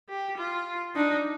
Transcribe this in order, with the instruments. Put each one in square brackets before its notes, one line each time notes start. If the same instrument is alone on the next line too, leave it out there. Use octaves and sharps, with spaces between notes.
[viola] G4
F4
[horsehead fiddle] D4 [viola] D#4